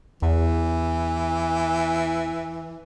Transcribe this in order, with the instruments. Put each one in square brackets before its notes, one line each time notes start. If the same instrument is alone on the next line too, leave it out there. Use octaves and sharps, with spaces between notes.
[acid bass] E2 [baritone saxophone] E3